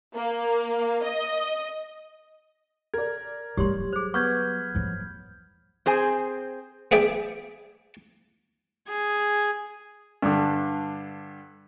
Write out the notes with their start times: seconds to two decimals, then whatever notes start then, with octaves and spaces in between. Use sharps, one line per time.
0.15 A#3
1.04 D#5
2.94 A#4 D5 G#6
3.57 F#3 G3 G4 C#5 C6
3.93 G#4 C5
4.14 B3 C#6 F6 G6 G#6
4.75 F3 F#3
5.86 C4 G#4 C5 G#5
6.91 B3 G#4 D5 E5 G5
8.88 G#4
10.22 G2 D3